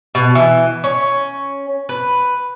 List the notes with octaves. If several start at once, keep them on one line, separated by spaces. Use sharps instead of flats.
B2
E3
C#4
B4